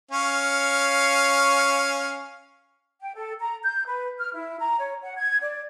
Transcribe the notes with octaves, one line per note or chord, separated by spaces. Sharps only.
C#4 C#5 F5
G5
A4
A#5
G6
B4
F6
E4
A#5
C#5
F#5
G#6
D5